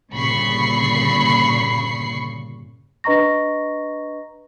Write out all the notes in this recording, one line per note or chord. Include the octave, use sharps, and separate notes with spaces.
G1 A#2 C#3 B5 C#6 C7
D4 B4 D#5 A#5 C#6 A#6